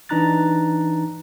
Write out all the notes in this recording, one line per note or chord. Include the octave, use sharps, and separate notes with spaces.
E3 D4 D#4 A#5 F#6 A6